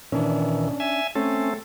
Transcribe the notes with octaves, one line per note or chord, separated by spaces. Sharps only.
A#2 D#3 E3 C#4 D4
E5 G#5
A3 C4 C#4 A4